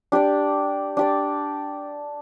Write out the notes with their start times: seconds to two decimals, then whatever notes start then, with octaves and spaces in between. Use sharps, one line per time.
0.12 D4 G4 D5
0.97 D4 G4 D5